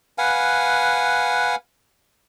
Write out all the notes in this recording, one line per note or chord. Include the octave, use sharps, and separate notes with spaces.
B4 F5 F#5 G#5